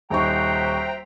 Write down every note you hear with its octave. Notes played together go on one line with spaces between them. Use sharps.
D#1 D#4 F#4 C5 E5 G5 A#5 C#6